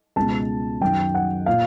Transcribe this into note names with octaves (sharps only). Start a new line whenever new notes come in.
C#2 B2 A5
F#2 D#3 G5
F#5
A#2 F5